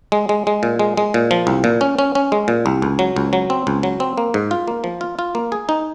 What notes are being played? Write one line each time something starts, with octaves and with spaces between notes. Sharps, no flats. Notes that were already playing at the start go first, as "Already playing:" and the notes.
G#3
G#3
G#3
A#2
G#3
G#3
A#2
F3
C2
A#2
C#4
C#4
C#4
G#3
A#2
C2
C#2
F#3
C#2
F#3
C4
C#2
F#3
C4
A#3
G#2
F4
A#3
F3
F4
F4
A#3
G#4
D#4